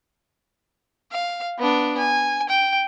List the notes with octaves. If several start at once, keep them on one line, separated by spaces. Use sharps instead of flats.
F5
B3 D4
G#5
G5